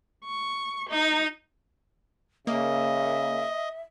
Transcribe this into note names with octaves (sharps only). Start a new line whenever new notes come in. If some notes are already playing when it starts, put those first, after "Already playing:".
C#6
D#4
C#3 A#3 D#5 E5